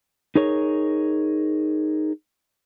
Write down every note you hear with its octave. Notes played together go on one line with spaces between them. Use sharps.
D#4 G#4 A#4 C#5